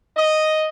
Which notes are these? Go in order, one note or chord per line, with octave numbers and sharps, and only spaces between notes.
D#5